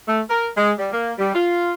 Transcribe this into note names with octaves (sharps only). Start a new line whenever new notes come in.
A3
A#4
G#3
G3
A#3
G3
F4